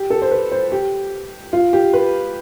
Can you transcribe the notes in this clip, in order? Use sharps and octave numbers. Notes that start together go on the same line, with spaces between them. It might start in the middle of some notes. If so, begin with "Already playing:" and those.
Already playing: G4
A4
C5
B4
C5
G4
F4
G4
B4